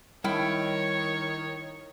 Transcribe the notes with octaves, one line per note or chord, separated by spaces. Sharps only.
D#3 G3 E4 C#5 G5